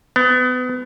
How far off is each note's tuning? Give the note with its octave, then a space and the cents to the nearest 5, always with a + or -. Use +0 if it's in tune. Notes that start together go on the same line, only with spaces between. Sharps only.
B3 +30